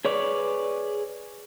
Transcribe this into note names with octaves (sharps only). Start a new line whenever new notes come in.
G#4 B4 C#5 D5